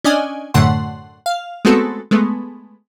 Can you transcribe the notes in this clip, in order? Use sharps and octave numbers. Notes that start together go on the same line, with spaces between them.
C#4 D4 D5 D#5 G#5
F#2 A2 D3 A3 F#5 C6
F5
G#3 A3 B3 C4 F#4 A4
G#3 A3 B3